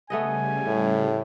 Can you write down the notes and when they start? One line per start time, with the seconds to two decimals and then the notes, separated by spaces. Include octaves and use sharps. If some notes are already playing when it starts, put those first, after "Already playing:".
0.10 C#3 G3 A3 B3 D#5 G#5
0.67 A2